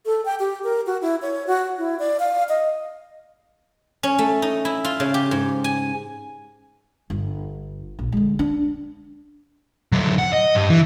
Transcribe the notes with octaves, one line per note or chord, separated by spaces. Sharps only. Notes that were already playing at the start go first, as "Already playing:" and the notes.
A4
G5
G4
A#4
F#4
E4
C#5
F#4
E4
D5
F5
D#5
C#4
A3
D#4
E4
F4
C#3
G4
G#2
G#5
G1
A#1
D3 G#3
D4
D3 F#3
F#5
D#5
G2
E3